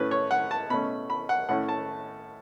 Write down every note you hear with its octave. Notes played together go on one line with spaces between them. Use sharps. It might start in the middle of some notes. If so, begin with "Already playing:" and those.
Already playing: A2 A3 C#4 B4
C#5
F#5
A5
B2 A3 C#4 B5
B5
F#5
A2 A3 C#4 F#5
A5